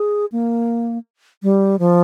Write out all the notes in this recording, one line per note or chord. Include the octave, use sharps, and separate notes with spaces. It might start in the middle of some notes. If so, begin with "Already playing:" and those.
Already playing: G#4
A#3
G3
F3